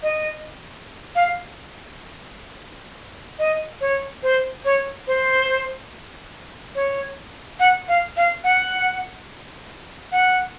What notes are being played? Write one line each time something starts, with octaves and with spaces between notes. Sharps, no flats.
D#5
F5
D#5
C#5
C5
C#5
C5
C#5
F#5
F5
F5
F#5
F#5